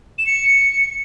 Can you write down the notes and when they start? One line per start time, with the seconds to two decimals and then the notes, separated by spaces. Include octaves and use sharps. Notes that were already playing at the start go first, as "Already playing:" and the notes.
0.18 E7
0.26 C#7